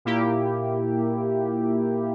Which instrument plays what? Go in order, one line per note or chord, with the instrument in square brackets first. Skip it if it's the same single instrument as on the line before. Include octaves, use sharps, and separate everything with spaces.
[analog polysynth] A#2 A#3 E4 G4